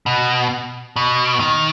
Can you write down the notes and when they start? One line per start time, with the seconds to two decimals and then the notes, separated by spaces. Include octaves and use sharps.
0.06 B2
0.96 B2
1.40 D#3